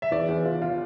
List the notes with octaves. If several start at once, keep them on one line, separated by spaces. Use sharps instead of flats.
E5
E2 D5
E2
F4
F4